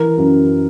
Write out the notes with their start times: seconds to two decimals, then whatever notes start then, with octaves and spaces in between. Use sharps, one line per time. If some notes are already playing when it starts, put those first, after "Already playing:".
Already playing: E3 A#4
0.18 F#2